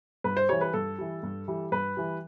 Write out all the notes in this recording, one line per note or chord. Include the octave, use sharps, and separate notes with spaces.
G2 B4
C5
E3 G3 C#5
B4
G2 A4
E3 G3
G2
E3 G3
G2 B4
E3 G3